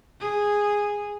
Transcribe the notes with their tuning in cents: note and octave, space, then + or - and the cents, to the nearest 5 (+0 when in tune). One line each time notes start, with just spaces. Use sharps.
G#4 -10